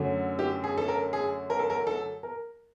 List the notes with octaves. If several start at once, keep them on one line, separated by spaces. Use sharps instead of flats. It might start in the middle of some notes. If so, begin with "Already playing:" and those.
Already playing: F#2 D3 F#3 A3
G4
G#4
A4
A#4
G#4
A#4
A4
A#4
A4
A#4